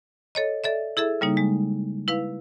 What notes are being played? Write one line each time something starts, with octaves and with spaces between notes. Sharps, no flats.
A4 C#5 D#5
A4 D5 E5
E4 G#4 A4 E5
C#3 G3 A#3 D#4
G#3
E4 B4 F5